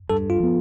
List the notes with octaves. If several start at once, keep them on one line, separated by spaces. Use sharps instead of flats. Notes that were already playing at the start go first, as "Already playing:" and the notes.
G2 A4
F4
F3 B3